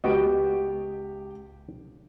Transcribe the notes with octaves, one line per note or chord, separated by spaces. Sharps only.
C#2 B3 F#4 G4 D#5 D7